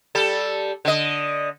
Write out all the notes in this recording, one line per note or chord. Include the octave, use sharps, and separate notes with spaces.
G3 A4
D3 D#5